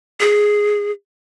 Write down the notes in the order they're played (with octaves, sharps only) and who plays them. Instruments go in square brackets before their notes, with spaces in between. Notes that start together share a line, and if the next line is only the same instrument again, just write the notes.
[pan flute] G#4